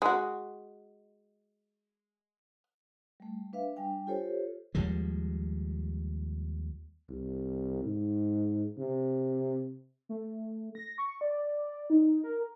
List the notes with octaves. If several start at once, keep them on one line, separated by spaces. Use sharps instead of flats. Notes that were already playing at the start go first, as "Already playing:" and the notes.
G#3 F#4
G3 A3
D4 B4 E5 F5
G3 D4 G5 G#5
F4 G4 A4 C5 C#5
D#2 F3 G3 G#3
C2
G#2
C3
A3
A#6
C#6
D5
D#4
A#4